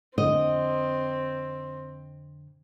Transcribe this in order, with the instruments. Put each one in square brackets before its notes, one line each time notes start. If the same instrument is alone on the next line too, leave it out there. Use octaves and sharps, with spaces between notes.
[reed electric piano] F2 D3 [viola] C4 [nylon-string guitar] D#5